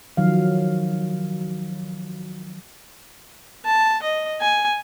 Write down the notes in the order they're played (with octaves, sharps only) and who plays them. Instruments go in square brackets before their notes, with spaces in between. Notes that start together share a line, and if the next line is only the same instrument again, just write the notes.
[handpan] D#3 F3 F#3 F5
[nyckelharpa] A5
D#5
G#5